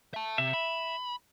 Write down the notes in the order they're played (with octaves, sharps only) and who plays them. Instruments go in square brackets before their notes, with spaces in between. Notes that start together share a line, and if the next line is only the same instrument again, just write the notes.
[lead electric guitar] E5 A5
[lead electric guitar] C3 [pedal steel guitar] E5
[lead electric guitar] B5